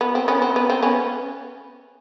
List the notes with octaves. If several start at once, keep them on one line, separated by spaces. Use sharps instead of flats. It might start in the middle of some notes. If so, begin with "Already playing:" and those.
B3
C4
B3 C#4
C4
B3
C4
B3 C#4